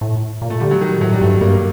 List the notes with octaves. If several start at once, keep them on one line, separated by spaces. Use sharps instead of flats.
A2
A#2
A3
D3 G3
F#3
D#3
A2 F#3
G3
G2 A3
G2 A#3